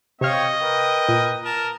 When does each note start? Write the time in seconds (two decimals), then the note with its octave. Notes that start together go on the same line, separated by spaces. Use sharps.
0.21 C3 C4 C#5 D#5 F5 G5
0.60 A#4 B4 G5
1.09 A#2
1.45 A#4 A5